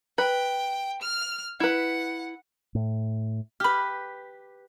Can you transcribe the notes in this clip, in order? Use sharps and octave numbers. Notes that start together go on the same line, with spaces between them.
B4 G5
F6
E4 B4 F#5
A2
G4 B4 B5 F6